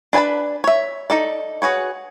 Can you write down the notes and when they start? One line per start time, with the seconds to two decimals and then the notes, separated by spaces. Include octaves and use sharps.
0.13 D4 B4 G#5 A5 B5
0.64 C#5 E5
1.10 D#4 A4 D5
1.62 F#4 G#4 B4 C#5